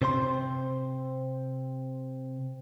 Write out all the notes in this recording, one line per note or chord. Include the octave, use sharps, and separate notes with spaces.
C3 C4 C5 C6